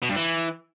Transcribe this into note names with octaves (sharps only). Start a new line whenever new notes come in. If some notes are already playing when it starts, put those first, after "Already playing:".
B2
G2
E3